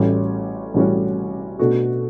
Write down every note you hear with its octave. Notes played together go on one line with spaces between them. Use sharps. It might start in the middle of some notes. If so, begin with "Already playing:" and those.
Already playing: A1 A2 G3 C#4 F#4
A1 A2 G3 C#4 F#4
B2 A3 D4 F#4 A4